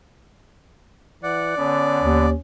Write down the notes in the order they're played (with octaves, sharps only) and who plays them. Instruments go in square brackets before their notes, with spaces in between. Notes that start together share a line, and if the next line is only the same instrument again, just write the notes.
[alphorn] E3 [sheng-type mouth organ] D5 [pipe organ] F#5
[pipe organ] D3 B3 [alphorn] C#4
[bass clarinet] D#2